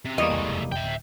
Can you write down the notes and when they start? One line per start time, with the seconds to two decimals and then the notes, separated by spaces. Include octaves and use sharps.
0.05 C3
0.18 E2 G3 A#3 F4 C#5 D#5
0.30 C2 F2 D3 G#3 A3
0.46 F1 F#2 B2
0.72 E5 G5
0.84 D1